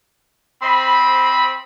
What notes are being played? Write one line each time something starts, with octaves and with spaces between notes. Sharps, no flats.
C4 C5 D#5 B5